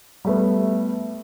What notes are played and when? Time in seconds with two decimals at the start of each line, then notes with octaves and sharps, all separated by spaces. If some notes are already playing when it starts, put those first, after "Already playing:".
0.25 G3 A3 B3